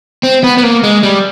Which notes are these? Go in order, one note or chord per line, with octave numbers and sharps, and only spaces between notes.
C4
B3
B3
A#3
G#3
G3